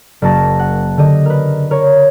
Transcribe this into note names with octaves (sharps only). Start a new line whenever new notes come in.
F#1 A#3 F#4 A5 A#6
F#5
D3 G4 D#5
A#4 B4
A#4 C#5